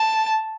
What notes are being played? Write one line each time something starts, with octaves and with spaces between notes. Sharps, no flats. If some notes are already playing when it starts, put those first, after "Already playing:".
Already playing: A5